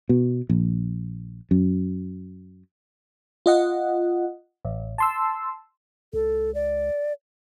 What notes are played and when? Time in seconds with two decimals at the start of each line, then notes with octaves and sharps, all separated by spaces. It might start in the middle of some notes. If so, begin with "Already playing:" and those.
0.09 B2
0.50 A#1
1.51 F#2
3.46 F4 D#5 F#5
4.65 A1
4.98 A5 C6 E6
6.13 C#2 A4
6.54 D5